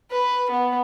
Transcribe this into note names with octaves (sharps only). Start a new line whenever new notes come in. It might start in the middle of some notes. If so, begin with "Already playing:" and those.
B4
B3